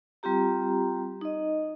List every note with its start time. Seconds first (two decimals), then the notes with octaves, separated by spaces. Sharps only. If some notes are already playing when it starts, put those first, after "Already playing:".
0.23 G3 C4 F4 G4 A#5
1.21 D#4 D#5